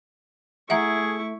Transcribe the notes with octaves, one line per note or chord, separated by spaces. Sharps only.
A3 E4 G#4 E5 F#5 A#5 C#6